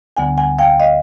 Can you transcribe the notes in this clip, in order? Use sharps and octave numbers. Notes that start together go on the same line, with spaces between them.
D2 D3 G3 B3 F#5 G#5
F#5 G#5
F5 G5
D#5 F5